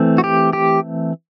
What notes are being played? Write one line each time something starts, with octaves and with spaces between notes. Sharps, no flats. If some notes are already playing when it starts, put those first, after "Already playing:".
Already playing: E3 A3 C4
F#4
G4
G4